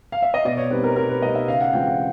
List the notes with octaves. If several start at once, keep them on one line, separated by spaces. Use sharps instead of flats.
F5
E5
D#5
B2 D5
C#5
G3 C4 D#4 B4
A#4
B2 A#4
B4
G3 C4 D#4 D#5
E5
C#3 F5
F#5
E3 G#3 C4 F4 G5
F5